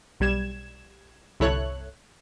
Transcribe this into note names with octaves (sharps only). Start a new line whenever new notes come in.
B1 G3 G#6 E7
G1 C2 E4 A4 C#5 F#6